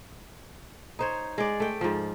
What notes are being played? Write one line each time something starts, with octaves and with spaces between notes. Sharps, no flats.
D#4 C5 C#5
G#3 D5
A3 G5
G#2 F3